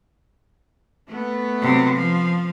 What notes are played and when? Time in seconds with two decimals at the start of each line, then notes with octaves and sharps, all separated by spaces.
1.09 A3 B3
1.62 C3 F#3
1.94 F3